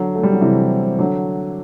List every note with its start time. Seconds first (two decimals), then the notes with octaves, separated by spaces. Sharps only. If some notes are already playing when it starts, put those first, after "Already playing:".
Already playing: D3 F#3
0.15 A3
0.23 G3
0.33 F#3
0.41 C3 E3
0.99 D3 F#3